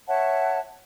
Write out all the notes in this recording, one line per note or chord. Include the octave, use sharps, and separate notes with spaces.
C#5 E5 F#5 A5